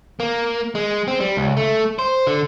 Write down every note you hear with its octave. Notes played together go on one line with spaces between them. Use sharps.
A#3
G#3
C4
G3
C#2
A3
C5
D3